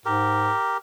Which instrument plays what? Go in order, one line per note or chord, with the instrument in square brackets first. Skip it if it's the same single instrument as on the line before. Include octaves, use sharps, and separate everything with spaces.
[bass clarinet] G#2 [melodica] G4 A#4